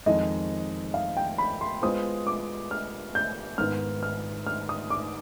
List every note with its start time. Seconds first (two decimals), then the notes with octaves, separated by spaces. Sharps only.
0.06 F2 D#3 G#3 D#5
0.94 F5
1.17 G5
1.38 B5
1.61 C6
1.82 G#3 B3 F4 C5 D#6
2.27 D6
2.71 F6
3.15 G6
3.58 G#2 D#3 B3 F6
4.03 F6
4.47 F6
4.69 D#6
4.90 D6